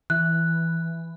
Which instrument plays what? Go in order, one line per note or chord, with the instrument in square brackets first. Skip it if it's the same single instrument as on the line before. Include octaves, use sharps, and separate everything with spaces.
[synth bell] E3 [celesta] F#6